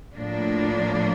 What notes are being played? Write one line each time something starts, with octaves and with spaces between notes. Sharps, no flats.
A2 F3 A#3 D4